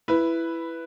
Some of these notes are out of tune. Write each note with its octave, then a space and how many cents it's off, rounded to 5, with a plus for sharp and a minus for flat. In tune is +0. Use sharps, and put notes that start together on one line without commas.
E4 +10 B4 +0